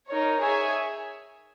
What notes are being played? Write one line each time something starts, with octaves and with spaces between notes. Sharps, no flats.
D#4 A#4 C#5
G#4 C#5 E5 G#5